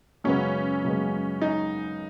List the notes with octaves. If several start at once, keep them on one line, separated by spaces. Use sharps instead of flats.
F#2 C#3 G#3 B3 C#4
F#2 C#3 G#3 B3
D#4